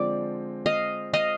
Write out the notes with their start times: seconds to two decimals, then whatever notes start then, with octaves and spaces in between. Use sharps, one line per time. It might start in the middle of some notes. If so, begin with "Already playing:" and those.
Already playing: D3 F3 G#3 C4 D5
0.66 D#5 F5
1.13 D#5 F5